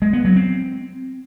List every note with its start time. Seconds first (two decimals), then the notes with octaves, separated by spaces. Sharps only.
0.02 G#3
0.13 B3
0.25 F#3
0.36 C4